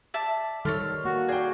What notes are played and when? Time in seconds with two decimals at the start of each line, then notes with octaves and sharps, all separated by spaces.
0.14 D5 E5 A5
0.65 D#3 G3 A4 C#5 C6 F6 A6
1.05 A#3 F#4
1.28 G#4 D5 G5